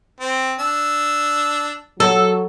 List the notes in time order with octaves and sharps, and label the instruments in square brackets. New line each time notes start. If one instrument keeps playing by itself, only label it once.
[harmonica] C4
D4 E6
[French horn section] F#3 [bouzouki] A4